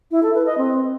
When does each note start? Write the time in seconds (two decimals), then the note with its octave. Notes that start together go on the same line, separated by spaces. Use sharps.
0.11 E4
0.23 A4
0.34 B4
0.46 D#5
0.58 C4